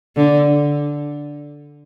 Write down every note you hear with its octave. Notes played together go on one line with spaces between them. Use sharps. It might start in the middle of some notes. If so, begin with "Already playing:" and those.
D3